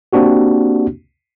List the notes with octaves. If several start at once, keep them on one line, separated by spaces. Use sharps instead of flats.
A#3 C4 D4 F#4 G4